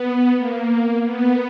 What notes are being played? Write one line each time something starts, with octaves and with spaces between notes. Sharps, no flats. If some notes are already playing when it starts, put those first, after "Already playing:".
Already playing: B3
A#3
B3